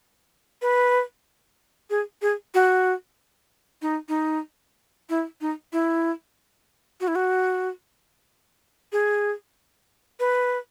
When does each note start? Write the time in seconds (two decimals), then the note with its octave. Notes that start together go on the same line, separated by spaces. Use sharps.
0.62 B4
1.90 G#4
2.22 G#4
2.54 F#4
3.82 D#4
4.09 D#4
5.10 E4
5.41 D#4
5.73 E4
7.01 F#4
7.08 E4
7.15 F#4
8.92 G#4
10.20 B4